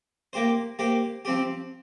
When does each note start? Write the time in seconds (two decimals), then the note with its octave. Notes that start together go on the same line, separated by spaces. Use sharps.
0.33 A#3 G4 C5
0.79 A#3 G4 C5
1.25 F3 C4 G4